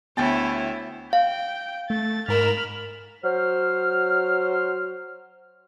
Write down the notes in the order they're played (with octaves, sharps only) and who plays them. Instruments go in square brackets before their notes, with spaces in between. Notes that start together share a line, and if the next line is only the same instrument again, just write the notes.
[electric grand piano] D2 G5 A6 [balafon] B3 [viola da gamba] E4 C#5
[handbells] F5 [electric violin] G5
[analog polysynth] A3 [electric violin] A6
[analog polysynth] G#2 A#4 E7 [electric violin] B5 F6
[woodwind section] F#3 C5 F6